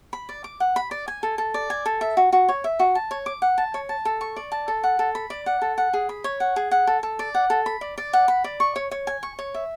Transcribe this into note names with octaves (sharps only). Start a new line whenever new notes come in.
B5
D5
D6
F#5
B5
D5
G#5
A4
A4
D5
G#5
A4
E5
F#4
F#4
C#5
E5
F#4
A5
C#5
D6
F#5
A5
C#5
A5
A4
C#6
D5
A5
A4
F#5
A4
B5
D5
F#5
A4
F#5
G#4
B5
C#5
F#5
G#4
F#5
A4
A4
D5
F#5
A4
B5
D5
D5
F#5
B5
D5
C#6
C#5
C#5
G#5
C#6
C#5
E5